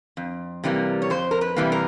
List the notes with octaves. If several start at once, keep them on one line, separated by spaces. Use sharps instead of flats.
F2
C3 E3 G3 A#3
C#5
F2 C5
A#4
B4
C3 E3 G3 A#3
A#4